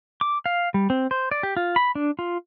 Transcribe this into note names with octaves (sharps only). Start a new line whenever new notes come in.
D6
F5
G3
C4
C5
D5
G4
F4
B5
D4
F4